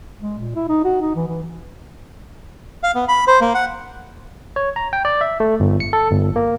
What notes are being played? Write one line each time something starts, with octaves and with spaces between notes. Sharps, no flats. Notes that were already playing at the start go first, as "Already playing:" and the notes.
G#3
A#2
E4
D#4
F#4
D#4
E3
E3
F5
B3
B5
C5
A#3
F#5
C#5
A#5
G5
D5
E5
A3
G1
C#7
A4
G1
A#3